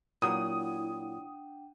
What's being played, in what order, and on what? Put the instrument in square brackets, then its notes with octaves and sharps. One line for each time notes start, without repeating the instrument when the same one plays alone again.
[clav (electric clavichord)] A#2 F#3 [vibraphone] D4 F#5 G5 [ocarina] E4 [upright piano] D#6